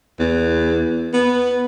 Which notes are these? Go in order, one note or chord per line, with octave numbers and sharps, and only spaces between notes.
E2
B3